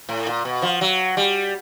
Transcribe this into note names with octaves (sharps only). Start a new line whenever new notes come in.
A2
A#2
B2
F3
F#3
G3